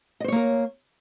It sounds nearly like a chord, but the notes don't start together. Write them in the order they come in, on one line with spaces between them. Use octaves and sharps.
D#5 C5 C#5 A#3 A#4